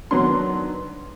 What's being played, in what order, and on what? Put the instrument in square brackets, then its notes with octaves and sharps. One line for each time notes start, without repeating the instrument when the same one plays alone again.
[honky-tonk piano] D#3 F#3 B3 D4 C6